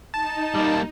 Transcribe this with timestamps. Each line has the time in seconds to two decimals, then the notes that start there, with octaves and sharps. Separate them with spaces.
0.14 D#4 A5
0.55 G3 A#3